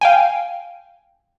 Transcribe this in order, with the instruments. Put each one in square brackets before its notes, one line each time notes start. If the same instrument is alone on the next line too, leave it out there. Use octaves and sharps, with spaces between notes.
[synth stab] F5 G5 G#5